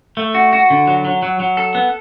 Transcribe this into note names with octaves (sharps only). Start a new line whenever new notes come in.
A3
F#4
F#4
D3
F#3
F#3
F#3
F#3
A4
B3